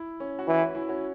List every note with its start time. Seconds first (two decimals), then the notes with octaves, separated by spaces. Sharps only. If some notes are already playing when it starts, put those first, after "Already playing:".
Already playing: E4
0.20 C#4
0.39 F#4
0.48 E3 E4
0.62 C#4 F#4
0.75 E4
0.89 C#4 F#4